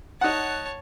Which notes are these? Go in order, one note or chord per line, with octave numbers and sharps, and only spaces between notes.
D#4 C#5 F#5 A5